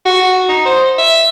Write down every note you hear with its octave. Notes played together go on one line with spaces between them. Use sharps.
F#4
D#4
C5
E5